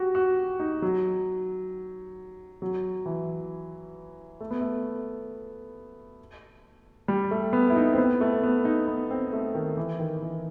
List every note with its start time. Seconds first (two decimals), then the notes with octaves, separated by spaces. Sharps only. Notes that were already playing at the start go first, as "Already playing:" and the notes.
Already playing: F#4 G4
0.15 F#4
0.60 D#4
0.82 F#3
2.62 F#3
3.06 E3
4.40 A3
4.51 B3
4.61 A3
7.08 G3
7.31 A3
7.53 B3
7.70 E4
7.76 D#4
7.93 C4
7.98 B3
8.21 A3
8.43 B3
8.65 D#4
8.88 B3
9.10 C4
9.33 A3
9.55 D#3
9.77 E3
9.99 D#3
10.22 E3